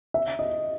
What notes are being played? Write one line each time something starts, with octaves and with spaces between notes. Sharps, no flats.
E5
D#5